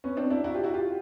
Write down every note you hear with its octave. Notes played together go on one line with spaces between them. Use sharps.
B3 C#4
C4 D4
D4 E4
E4 F#4
F4 G4
E4 F#4
F4 G4